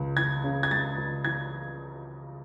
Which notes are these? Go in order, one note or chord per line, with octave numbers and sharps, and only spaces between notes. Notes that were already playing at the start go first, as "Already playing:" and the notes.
Already playing: C#2 G#3
E3 G#6
C#3
G#6
G#3 A6
C#2
E3 G#6